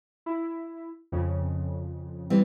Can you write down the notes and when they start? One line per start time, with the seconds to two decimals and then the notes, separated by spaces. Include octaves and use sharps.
0.26 E4
1.12 F2 C#3
2.30 E3 G3 C4